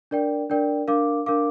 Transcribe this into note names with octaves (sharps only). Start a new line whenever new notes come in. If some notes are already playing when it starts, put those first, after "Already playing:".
D4 A#4 D5 G5
D4 A#4 D5 G5
D4 A#4 F5 D6
D4 A#4 F5 D6